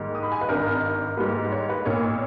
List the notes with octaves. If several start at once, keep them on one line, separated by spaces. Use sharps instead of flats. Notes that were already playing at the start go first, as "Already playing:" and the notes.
Already playing: G#2 D#3 G3 A#3
D#6
B5
G#5
B4
G#1 G2 D#3 A#4
G#2 G3 A#3 B4
C#5
B4
B1 A#2 A#3 C#5